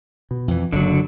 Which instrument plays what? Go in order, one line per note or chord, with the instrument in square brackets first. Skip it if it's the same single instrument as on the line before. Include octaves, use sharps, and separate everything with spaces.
[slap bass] B2
F2 E3
[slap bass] F#1 [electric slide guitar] D3 F#3